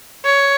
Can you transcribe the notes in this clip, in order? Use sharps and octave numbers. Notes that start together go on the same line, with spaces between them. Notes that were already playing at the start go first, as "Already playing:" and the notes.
C#5